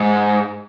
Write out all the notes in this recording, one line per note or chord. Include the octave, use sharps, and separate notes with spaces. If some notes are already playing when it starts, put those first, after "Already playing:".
Already playing: G#2